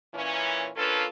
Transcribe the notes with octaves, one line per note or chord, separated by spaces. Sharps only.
A#2 E3 C#4
A#3 C#4 D4 F4 A4 B4